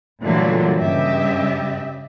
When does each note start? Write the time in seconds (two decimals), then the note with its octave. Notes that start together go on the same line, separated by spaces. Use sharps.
0.22 A#2 D3 E3 F#3 G3 A3
0.78 G2 C#3 G4 D#5 E5